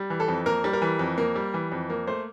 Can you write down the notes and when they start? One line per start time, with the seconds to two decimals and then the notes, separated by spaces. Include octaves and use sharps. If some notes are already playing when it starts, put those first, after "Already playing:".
Already playing: G3
0.10 E3
0.20 A4
0.28 F2
0.46 A#3 A#4
0.64 G3
0.73 A#4
0.82 E3
0.99 F2
1.18 A#3
1.36 G3
1.54 E3
1.72 F2
1.90 A#3
2.07 A3 C5